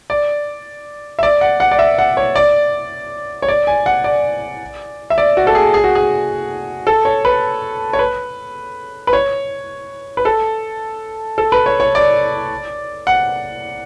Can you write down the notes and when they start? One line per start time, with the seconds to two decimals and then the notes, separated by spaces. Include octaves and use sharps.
0.10 D5
1.19 E5
1.23 D5
1.41 F#5
1.60 F#5
1.71 D5
1.79 E5
1.99 F#5
2.17 C#5
2.36 D5
3.42 C#5
3.48 D5
3.67 G#5
3.86 F#5
4.04 D5
5.10 E5
5.18 D5
5.37 F#4
5.47 A4
5.55 G#4
5.74 G#4
5.84 F#4
5.95 G#4
6.87 A4
7.05 C#5
7.25 B4
7.93 C#5
7.99 B4
9.07 B4
9.13 C#5
10.17 B4
10.25 A4
11.38 A4
11.52 B4
11.66 C#5
11.80 C#5
11.95 D5
13.07 F#5